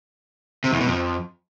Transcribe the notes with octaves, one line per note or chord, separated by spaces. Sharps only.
C3
E2
B2
F2